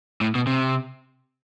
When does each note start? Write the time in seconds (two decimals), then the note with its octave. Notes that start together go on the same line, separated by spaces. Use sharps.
0.21 A2
0.35 B2
0.47 C3